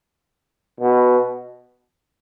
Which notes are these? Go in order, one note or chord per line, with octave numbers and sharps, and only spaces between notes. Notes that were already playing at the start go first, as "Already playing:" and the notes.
B2